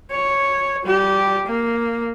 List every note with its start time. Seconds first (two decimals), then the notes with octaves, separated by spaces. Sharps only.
0.11 C#5
0.85 G3 G4
1.47 A#3